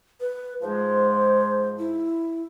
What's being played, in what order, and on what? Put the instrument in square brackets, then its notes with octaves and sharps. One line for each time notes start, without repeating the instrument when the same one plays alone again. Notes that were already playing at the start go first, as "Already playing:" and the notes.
[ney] B4
[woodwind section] G#2 F3 G#3 [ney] C5
[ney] E4